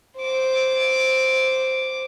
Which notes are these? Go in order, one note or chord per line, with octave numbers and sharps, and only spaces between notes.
C5 D6